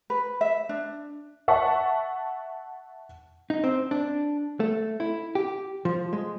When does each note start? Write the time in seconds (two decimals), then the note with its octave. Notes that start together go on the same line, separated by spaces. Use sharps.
0.10 B4
0.41 E5
0.69 D4
1.48 E5 F#5 A5 C#6
3.50 D#4
3.64 C4
3.91 D4
4.60 A3
5.00 E4
5.35 G4
5.85 F3
6.13 G#3